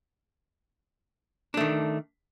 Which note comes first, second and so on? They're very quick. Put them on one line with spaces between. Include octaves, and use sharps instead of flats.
D4 A3 D#3